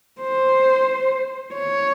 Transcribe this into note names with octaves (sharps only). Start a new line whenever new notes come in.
C5
C#5